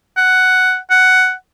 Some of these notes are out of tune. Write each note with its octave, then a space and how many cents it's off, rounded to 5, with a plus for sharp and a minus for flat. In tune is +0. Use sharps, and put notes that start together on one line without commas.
F#5 +5
F#5 +10